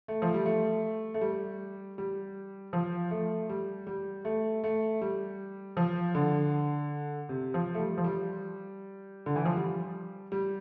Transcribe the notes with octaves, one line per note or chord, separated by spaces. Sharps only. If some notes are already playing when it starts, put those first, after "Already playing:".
A3
F3
G3
A3
A3
G3
G3
F3
A3
G3
G3
A3
A3
G3
F3
D3
C3
F3
A3
G3
F3
G3
D3
E3
F3
G3
G3